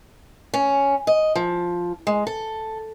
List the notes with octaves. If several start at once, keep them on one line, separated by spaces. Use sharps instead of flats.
C#4
D#5
F3
G#3
A4